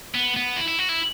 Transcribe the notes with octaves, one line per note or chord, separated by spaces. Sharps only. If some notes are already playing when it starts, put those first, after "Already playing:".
B3
B3
E4
E4
F#4
E4